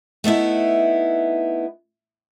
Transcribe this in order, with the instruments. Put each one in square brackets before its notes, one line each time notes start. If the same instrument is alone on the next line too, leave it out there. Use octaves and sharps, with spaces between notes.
[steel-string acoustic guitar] A3 B3 D#4 E4